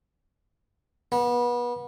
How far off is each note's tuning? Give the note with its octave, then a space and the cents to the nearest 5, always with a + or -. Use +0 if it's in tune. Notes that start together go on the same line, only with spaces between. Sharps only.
B3 -30